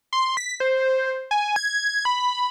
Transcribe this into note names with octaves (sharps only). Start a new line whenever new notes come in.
C6
B6
C5
G#5
G#6
B5